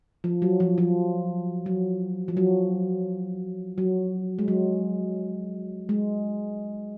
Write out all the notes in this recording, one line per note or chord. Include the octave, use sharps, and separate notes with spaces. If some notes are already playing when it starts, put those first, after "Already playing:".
F3
F#3
F3
F3
F#3
F3
F#3
F#3
G#3
F#3
G#3